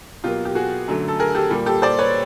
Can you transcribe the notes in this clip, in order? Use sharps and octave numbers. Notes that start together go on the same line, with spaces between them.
B2 F#3 A#3 F4 G4
G4
F#4 G#4
F#2 D3 F#3 A3
A4
G#4 A#4
G4 A4
A#2 G3 A#3
G4 A4
C5 D5
B4 C#5